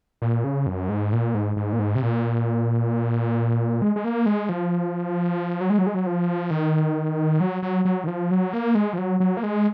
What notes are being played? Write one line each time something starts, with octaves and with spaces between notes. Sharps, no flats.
A#2
C#3
F#2
G#2
A#2
G#2
G#2
A#2
G#2
C3
A#2
G#3
G#3
A#3
G#3
F3
F#3
G#3
F#3
G#3
F#3
F3
D#3
F#3
F#3
F#3
D#3
F3
F#3
A#3
G#3
F3
F#3
F#3
A#3
G#3